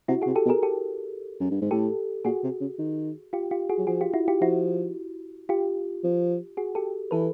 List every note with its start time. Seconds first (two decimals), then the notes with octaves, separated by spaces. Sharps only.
0.08 C3 E4 F#4
0.22 C3 F#4 G#4
0.35 G4 A4
0.45 B2
0.49 G#4 A#4
0.63 G4 A4
1.40 F#2
1.51 G2
1.61 G#2
1.71 A2 G4 A4
2.24 A#2 F#4 G#4
2.43 C3
2.61 C#3
2.78 D#3
3.33 F4 G4
3.51 F4 G4
3.69 F#4 G#4
3.78 F#3
3.87 F3 F#4 G#4
4.01 F4 G4
4.14 E4 F#4
4.28 F4 G4
4.41 F3 E4 F#4
5.49 F4 G4
6.04 F3
6.57 F#4 G#4
6.75 G4 A4
7.11 E3 A4 B4